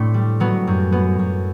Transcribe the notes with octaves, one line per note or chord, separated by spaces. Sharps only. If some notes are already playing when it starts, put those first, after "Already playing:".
Already playing: A2 A3 C4 D4
G3
F#3 B3
F#2
F#3 B3
F#2